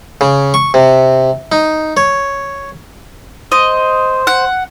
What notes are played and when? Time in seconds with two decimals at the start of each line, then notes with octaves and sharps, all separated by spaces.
0.21 C#3
0.54 C#6
0.74 C3
1.52 D#4
1.97 C#5
3.52 C5 D#5
4.27 F#5